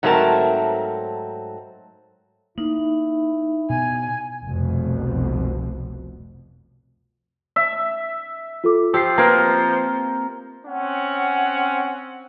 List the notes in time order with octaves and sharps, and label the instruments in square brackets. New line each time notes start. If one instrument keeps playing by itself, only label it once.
[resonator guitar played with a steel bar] G#2 F#3 A3 C4 A#4 A5
[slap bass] A#3 [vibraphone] D#4 [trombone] E4
[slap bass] B2 [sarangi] G#5
[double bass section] F1 C2 F2 B2
[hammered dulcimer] E5
[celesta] F4 A4 D6
[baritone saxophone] F3 [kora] G4 [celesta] E6 C7
[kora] A#3 C4 [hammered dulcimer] A#4 [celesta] B4 G#6
[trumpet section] C4 C#4 F#5